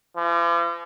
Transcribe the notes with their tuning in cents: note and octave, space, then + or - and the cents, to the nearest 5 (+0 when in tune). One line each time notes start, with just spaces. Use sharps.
F3 -45